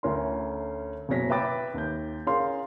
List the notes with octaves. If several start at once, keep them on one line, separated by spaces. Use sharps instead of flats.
D2 A3 C#4 A#4 C6
F#1 B2 C#5 A#6 B6
B4 E5 G5 D6 A6
D#2 G6
C#4 G#4 A#4 C#5 F5 C6